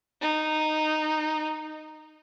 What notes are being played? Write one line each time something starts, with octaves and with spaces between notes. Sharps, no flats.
D#4